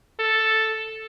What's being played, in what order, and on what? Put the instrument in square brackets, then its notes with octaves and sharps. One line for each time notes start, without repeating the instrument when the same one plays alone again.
[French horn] A4